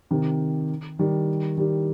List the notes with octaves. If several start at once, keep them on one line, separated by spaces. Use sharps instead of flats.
C3 D#3
D#3 G3
D#3 G3